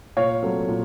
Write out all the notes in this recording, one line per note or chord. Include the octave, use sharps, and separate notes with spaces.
A#2 C#5 F5
F#3 A3 C4
A#2